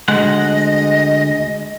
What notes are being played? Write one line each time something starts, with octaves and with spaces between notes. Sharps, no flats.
D2 G#3 D#5 F#5